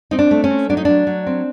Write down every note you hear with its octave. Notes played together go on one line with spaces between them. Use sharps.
C4 D#4
D4
A3
C#4
C4
F#3 D4
D#4
F#3 D4
F#3
C4